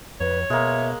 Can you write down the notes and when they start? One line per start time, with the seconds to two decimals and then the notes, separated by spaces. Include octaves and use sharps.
0.20 F2 B4 C#5
0.50 B2 G#3 A#3 E5